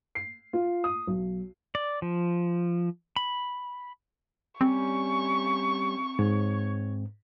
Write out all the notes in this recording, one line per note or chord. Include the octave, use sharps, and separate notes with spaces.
C7
F4
D#6
B1
D5
F3
B5
G3 C4 C#4 C#6
G#2 C#5